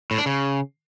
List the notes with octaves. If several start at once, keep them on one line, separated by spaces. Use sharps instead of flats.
A2
D4
C#3